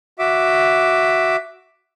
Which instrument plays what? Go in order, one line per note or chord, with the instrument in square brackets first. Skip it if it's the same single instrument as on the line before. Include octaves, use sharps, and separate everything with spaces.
[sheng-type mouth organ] F#4 E5 D6